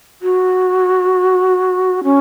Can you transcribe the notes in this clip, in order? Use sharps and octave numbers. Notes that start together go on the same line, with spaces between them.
F#4
C#4